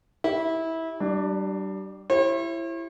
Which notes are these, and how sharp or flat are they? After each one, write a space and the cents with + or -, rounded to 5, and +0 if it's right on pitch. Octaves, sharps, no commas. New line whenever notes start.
E4 -20 G4 +0
G3 -30 D4 +20
E4 +20 G4 +0 C#5 -45